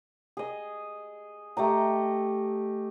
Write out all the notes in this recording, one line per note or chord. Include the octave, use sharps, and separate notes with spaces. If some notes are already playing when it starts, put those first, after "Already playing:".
G#4 D#5
A3 G4 D#5 A#5